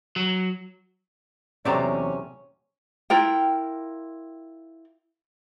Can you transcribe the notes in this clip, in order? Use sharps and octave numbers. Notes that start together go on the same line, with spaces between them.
F#3
E2 C3 F#3 A3 C4 C#4 D5 A#5
E4 F4 A#4 G5